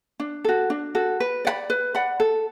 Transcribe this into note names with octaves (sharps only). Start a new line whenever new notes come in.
D4
F#4 A4
D4
F#4 A4
B4
D5 F#5 B5
B4
D5 F#5 B5
A4